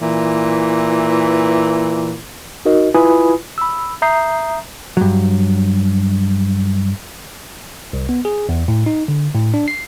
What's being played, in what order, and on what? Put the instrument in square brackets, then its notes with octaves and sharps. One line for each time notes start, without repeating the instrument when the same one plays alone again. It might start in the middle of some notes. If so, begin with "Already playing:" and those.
[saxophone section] A#2 E3
[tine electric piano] D#4 F#4 A#4 D#5
E4 F4 B4 G#5 B5 D#6
B5 E6
E5 A#5 D#6 G6 C7
[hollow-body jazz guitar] G2 F#3
[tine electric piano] C2
B3
G#4
E2
A2
D#4
D3
A2
D4
C7